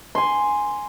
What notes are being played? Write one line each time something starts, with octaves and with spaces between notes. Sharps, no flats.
G#5 C6